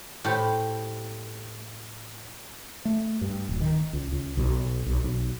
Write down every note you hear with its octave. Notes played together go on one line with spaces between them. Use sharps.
A2 G4 C5
A3
G2
D1
D#3
C#2
C#2
B1
B1
B1